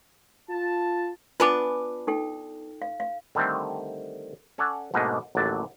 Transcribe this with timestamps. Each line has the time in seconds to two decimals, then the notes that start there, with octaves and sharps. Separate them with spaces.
0.50 F4 A5
1.40 B3 D4 F4 B4 G#5 D6
2.07 D#4 A4 G5
2.82 F5
3.00 F5
3.35 D3 D#3 G3 A3 C4
4.58 C#4 A4 C#5 D5 F#5
4.94 G#2 B2 A3 A#3 D4 D#5
5.35 A1 D#2 D3 F#3 D5 A5